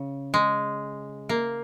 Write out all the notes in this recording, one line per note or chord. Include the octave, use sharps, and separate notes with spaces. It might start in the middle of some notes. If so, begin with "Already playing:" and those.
Already playing: C#3
G#3
A#3